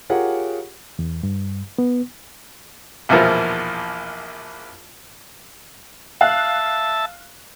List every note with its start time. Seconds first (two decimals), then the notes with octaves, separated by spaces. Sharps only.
0.10 F4 G4 G#4 A#4 C#5 F#5
0.99 E2
1.23 G2
1.78 B3
3.09 A#1 E2 B2 F3 A#3
6.21 E5 F5 A5 F#6